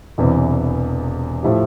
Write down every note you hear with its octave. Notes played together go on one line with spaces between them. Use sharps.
E1 E2 C3 E3
A2 F3 A3 E4 G4